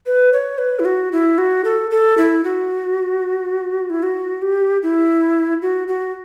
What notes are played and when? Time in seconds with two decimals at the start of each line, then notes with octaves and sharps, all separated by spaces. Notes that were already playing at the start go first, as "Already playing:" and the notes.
0.06 B4
0.33 C#5
0.58 B4
0.79 E4
0.85 F#4
1.12 E4
1.38 F#4
1.65 A4
1.91 A4
2.18 E4
2.44 F#4
3.90 E4
4.03 F#4
4.42 G4
4.83 E4
5.62 F#4
5.88 F#4